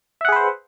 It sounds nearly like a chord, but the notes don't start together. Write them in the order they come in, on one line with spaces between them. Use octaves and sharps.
E5 F#5 G#4 B4 C5